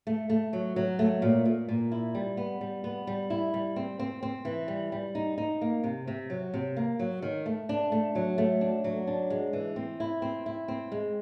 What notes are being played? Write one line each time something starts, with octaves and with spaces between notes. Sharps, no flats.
A3
A3
F#3
F#3
A3
A#2
A#2
A#2
E4
G3
B3
G3
B3
G3
E4
G3
C4
C4
C4
E3
G3
G3
D#4
D#4
A#3
C3
C3
F#3
C3
A#3
F#3
D#3
A3
D4
A3
F#3
A3
D4
F#3
D4
G#3
E3
C4
E4
C4
E4
C4
G#3